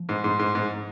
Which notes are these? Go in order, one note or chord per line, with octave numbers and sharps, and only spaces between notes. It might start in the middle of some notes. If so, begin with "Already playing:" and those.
Already playing: F3
G#2
G#2
G#2
G#2